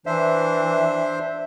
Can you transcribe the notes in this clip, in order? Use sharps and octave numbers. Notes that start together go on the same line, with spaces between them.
E3 D4 C5 E5